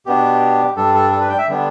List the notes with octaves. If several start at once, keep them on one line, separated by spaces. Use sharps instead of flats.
B2 B3 D4 G4
G2 G3 D4 A4
A4
A4
B4
G5
E5
D3 G3 B3 D4